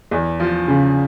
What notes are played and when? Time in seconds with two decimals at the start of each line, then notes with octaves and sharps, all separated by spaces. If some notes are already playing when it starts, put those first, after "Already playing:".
0.11 E2
0.40 F3
0.68 C#3